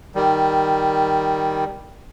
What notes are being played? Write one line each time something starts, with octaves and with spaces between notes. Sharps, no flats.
D#3 G3